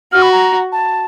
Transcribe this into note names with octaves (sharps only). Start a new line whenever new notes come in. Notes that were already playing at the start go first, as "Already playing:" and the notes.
F#4 F6
B5
A#5
A5